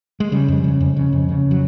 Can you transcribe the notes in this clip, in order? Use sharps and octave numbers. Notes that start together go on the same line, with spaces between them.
G#3
C#3 G3
F2
C#3
F2
C#3
F2
C#3
F#3